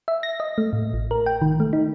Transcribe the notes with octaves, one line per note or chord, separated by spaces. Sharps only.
E5
A#6
D#5
A3
A2
A1
A#4
G5
D#3
A3
D#4